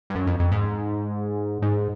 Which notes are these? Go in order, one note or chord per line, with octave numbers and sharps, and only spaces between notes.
G2
F#2
F2
F2
G#2
G#2